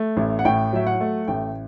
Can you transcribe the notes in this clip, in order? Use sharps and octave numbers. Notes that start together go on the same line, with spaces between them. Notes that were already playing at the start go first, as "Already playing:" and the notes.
Already playing: A3
A1
F#5
A2 G5
F#3 E5
F#5
A3
A1 G5